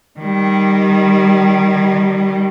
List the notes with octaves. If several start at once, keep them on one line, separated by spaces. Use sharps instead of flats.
D#3 G3